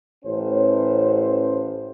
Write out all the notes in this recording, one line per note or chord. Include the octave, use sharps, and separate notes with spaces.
A1 A2 C#4 C5